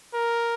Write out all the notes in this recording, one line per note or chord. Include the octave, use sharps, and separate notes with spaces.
A#4